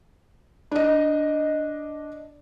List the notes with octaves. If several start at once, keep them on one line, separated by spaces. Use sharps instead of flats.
D4 D#5